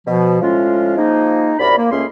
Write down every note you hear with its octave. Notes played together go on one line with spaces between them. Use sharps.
B2 F3
A2 F3 G#3 C#4 F4
F3 G#3 A#3 D#4
C2 F#2 A#4 D5 B5
A#3
C#2 A3 A#3 C#4 G#4 C6